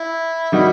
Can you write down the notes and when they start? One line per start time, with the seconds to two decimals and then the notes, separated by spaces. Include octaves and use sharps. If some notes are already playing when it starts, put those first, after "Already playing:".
Already playing: E4
0.52 D#3 G3 D#4 F#4